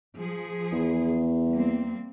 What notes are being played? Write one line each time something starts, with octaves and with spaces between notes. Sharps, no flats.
F3 G#4
E2
G3 A#3 C4